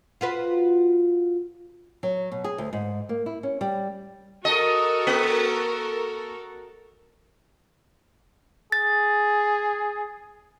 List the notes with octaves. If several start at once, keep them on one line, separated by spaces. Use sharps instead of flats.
F4 F#4 B4
F#3
B2
G#4
D2
G#2
A#3
E4
C#4
G3
F#4 A4 A#4 D#5
A#3
G#4 A6